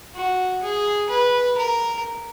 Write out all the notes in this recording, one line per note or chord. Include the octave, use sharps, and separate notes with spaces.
F#4
G#4
B4
A#4